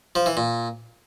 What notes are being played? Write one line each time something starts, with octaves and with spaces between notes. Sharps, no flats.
F3
E3
A#2